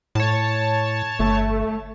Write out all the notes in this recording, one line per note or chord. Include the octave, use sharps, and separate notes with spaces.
A2 C#5 A5
G1 A3